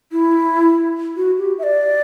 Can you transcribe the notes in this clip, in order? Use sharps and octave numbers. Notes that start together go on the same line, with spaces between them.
E4
F#4
G4
E5
D5